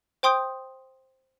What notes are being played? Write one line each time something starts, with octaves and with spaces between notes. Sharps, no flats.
C5 G5 C6 D#6 G6 D7